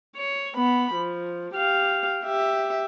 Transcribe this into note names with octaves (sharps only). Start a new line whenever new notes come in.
C#5
B3 B5
F3
G4 F5
G4 E5